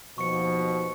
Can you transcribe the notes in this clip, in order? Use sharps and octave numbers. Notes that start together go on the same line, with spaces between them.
D#2 B2 F3 C#6 C#7